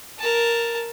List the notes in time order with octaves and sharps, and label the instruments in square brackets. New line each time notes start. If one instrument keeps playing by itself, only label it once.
[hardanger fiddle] A#4 A5